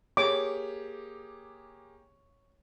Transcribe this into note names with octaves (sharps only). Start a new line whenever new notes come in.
A#3 G4 G#4 C#5 D6